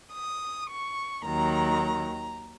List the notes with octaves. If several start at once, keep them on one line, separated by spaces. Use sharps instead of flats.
D#6
C#6
D#2 D#3 F#3 A#5